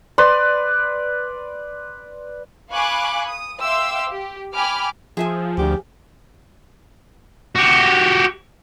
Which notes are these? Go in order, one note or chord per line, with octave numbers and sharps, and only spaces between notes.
B4 D5 C6
F5 G#5 B5 C#6 D6 F#6
D#6
E5 F5 G5 C6 D6 E6
G4
G5 G#5 B5 D6 F6
F3 G#4 E5 G#5
D2 G4
F#4 G4